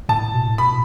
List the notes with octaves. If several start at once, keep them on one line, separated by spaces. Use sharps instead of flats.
A2 A5
B2
A2
B2 B5